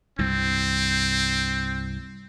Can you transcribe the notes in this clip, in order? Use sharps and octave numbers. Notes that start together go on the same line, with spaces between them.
C2 G2 C4